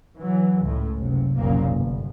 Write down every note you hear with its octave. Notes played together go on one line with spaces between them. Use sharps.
E3 F#3
C#2 A2
F#1 C3
F#1 C2 A#2 C#3 A#3
G1